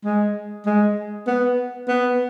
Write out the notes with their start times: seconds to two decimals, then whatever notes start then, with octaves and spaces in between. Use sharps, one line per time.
0.05 G#3
0.66 G#3
1.27 B3
1.88 B3